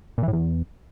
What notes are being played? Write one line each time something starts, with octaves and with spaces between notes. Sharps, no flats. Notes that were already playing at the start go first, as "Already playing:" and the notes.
A#2
E3
A2
E2